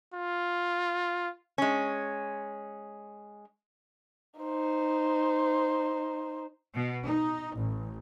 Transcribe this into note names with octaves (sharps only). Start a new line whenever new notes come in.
F4
G#3 C#4
D#4 C5
B2
D#4
A1